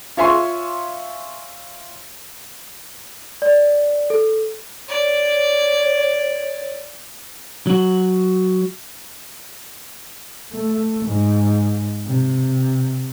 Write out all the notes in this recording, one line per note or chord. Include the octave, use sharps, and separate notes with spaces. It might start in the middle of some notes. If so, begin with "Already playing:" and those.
F4 C#5 E5 G#5 C6 C#6
D5
A4
C#5 D5
F#3 F#4
A3
G#2
C3